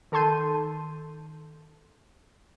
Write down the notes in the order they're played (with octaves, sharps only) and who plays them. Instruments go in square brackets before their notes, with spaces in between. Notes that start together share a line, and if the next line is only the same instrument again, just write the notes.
[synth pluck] D#3 A4 A5 C6 G6 D#7